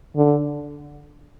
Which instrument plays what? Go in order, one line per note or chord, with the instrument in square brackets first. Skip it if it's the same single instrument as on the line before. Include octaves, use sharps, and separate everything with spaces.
[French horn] D3